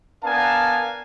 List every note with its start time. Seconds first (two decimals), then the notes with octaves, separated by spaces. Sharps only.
0.24 B3 D4 A#4 F5 G#5 A5